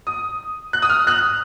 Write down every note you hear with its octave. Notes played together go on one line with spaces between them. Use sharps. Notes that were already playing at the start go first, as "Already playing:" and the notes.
D#6
F#6
D#6
F6
F#6